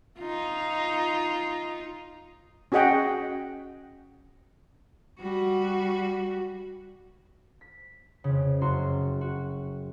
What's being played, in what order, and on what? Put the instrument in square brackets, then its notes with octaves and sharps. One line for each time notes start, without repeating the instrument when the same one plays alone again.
[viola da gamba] D#4 F4
[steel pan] C#4 F#4 G#4 D#5 F#5 G5
[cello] G3 F#4
[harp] B6
F2 C#3
F#1 F#4 A#5 C6
F#4